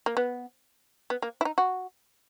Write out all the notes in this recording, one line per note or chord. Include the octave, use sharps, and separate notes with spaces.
A#3
B3
B3
A#3
E4
D#4
F#4